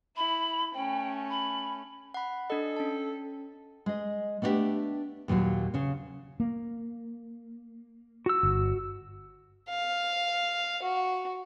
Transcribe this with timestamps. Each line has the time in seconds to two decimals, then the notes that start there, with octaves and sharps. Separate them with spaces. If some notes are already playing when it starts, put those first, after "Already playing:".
0.17 E4 B5
0.74 A3 C#4 G5
1.30 B5
2.14 F#5 B5
2.50 D4 A4 D#5
2.76 C#4 A5
3.86 G#3 D#5
4.42 A3 B3 D4 D#4 G4 E5
5.28 D#2 A#2 E3 F#3 F4
5.74 C#3 C#4
6.40 A#3
8.26 F#4 E6
8.43 G1
9.69 F5
10.82 F#4